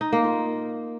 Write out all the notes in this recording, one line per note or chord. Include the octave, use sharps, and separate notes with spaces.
D#4
A#3
F4